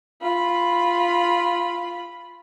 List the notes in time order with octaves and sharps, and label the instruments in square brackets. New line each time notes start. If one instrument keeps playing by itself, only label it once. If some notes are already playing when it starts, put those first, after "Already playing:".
[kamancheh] F4 B5